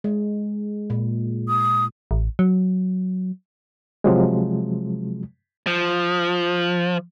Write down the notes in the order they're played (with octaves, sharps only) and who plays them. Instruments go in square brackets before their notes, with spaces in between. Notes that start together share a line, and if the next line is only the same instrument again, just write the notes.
[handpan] G#3
A#2
[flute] D#6
[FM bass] A1
F#3
[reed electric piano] C3 F3 F#3 G#3
[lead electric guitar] F3